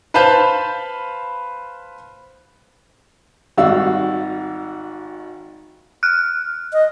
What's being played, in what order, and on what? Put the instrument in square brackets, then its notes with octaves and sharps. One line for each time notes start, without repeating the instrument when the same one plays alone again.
[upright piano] B4 C5 F5 A5 B5 G6
[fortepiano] G#1 G3 D#4 F#4 F5 E6
[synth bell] F6 F#6
[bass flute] D#5